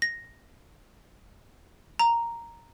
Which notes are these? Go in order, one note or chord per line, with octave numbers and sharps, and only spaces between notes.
A#6
A#5